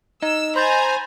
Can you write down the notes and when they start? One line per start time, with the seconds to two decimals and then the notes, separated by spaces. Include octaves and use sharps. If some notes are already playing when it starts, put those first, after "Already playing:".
0.22 D#4 D#5 E6
0.56 C5 G#5 A#5 B5 G6 A6